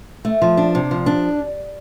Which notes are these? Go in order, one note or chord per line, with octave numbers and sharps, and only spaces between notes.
A3
F3
D4
C3
F3
D4